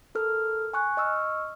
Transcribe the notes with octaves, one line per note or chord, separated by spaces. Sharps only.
A4 A#4 F6
G#5 C#6 F#6
D#5 C#6 E6 F6